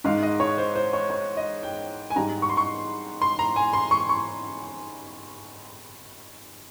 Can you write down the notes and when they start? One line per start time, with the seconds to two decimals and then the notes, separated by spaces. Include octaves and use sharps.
0.04 G#2 D#3 G#3 F5
0.23 D#5
0.40 C#5
0.58 C5
0.75 C5
0.93 C#5
1.10 C#5
1.37 D#5
1.63 G5
2.10 G#5
2.16 G#2 D#3 G3 A#5
2.42 C#6
2.49 C6
2.57 C#6
3.22 C6
3.39 A#5
3.56 G#5
3.73 C6
3.91 C#6
4.09 C#6